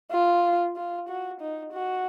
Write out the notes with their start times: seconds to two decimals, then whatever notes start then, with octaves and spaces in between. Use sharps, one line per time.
0.12 F4
0.77 F4
1.09 F#4
1.41 D#4
1.73 F#4